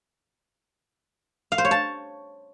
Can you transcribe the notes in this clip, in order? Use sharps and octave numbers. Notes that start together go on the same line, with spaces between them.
F5
C5
C#5
A5